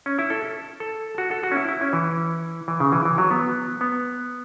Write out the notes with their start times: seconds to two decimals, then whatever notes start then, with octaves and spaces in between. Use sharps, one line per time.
0.06 C#4
0.19 E4
0.30 A4
0.80 A4
1.18 F#4
1.31 A4
1.43 F#4
1.51 C#4
1.56 E4
1.69 E4
1.81 C#4
1.93 E3
2.68 E3
2.80 C#3
2.92 E3
3.05 E3
3.18 F#3
3.31 B3
3.81 B3